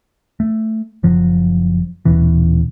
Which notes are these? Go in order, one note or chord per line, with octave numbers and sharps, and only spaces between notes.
A3
F#1 F3 F#3
D#1 B2 E3